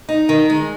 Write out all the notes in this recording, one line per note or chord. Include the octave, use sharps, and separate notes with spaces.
D#4
D#3
G#3